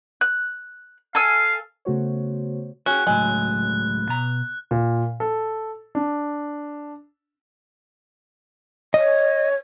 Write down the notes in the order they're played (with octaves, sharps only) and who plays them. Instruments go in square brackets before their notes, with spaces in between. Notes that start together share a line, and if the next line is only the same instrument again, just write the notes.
[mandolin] F#6
[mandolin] A4 G#5 E6 [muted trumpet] F5
[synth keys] C#3 A3 B3 F#4 C5 C#5
[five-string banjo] C#4 [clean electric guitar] F#4 G#4 [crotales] F#6
[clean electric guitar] C#2 A2 F#3 [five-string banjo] G#3
[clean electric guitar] B2 A#5
[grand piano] A#2
A4
D4
[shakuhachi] C#5 [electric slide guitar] D#5